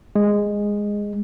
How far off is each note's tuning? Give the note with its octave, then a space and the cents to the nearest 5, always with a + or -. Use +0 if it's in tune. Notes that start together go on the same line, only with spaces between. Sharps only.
G#3 -10